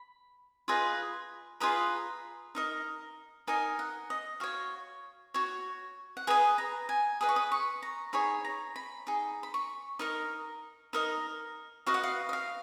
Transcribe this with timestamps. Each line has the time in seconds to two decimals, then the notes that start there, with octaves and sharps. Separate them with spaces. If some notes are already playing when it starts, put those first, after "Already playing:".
Already playing: B5
0.68 F4 G#4 B4 D#5
1.60 F4 G#4 B4 D#5 A#5
2.55 D#4 A#4 D#5
3.47 D#4 A#4 D#5 G#5
3.79 F#5
4.10 D#5
4.40 F#4 C#5 F5
5.34 F#4 C#5
6.17 F#5
6.27 G#4 B4 D#5 G#5
6.58 A#5
6.89 G#5
7.21 G#4 B4 D#5 D#6
7.29 C#6
7.36 D#6
7.52 C#6
7.83 A#5
8.13 D#4 G#4 C#5 B5
8.45 A#5
8.76 B5
9.07 D#4 G#4
9.43 B5
9.54 C#6
9.99 D#4 A#4 D#5
10.93 D#4 A#4 D#5
11.86 F#4 B4 D#5 F5
11.94 F#5
12.03 F5
12.29 D#5
12.33 F5